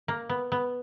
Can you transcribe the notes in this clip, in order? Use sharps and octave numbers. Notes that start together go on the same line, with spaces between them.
A#3
B3
B3